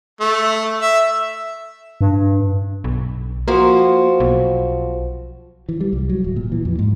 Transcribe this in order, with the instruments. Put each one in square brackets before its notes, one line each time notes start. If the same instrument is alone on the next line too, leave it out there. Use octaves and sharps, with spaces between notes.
[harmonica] A3
E5
[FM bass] G2
B1
[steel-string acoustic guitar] F3 F#4 C5 [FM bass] A#3
[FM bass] B1
[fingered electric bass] E3
G3
C2
F#3
D1
A#2
E3
F2
G#2